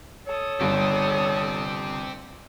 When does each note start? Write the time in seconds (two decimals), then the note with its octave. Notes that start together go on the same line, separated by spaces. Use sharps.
0.27 A4 C#5 D#6
0.61 G1 C4 G4